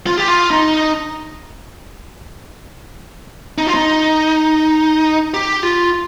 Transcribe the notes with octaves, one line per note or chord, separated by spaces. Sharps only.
F4
G4
F4
D#4
D#4
F4
D#4
G4
F4